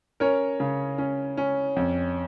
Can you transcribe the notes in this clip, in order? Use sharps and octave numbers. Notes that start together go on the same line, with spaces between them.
C#4 A#4 C#5
C#3
C#4
C#4
F2